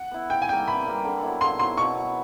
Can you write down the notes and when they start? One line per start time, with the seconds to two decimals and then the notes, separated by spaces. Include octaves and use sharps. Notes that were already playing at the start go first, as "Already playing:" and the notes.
Already playing: F#5
0.11 B3 E4
0.30 E3 G5
0.42 G#5
0.49 G3 A#3 G5
0.67 E3 B5
0.86 G3 A#3
1.04 D3
1.23 F#3 B3 E4
1.41 D3 C6
1.59 F#3 B3 E4 C6
1.78 B2 C#6
1.97 F#3 B3